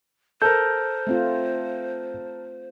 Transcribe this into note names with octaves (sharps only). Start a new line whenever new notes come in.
A4 A#4 C5 G6
A3 C4 F4